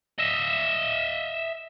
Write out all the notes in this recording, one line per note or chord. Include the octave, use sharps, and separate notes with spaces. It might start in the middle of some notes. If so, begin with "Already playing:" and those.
D#5 E5